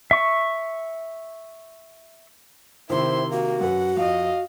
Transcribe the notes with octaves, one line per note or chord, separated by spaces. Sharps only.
E5 C#6
C3 D#3 E4 C5 C6
A#3 F#4
F#2 B4 F#5
F2 D#5 F5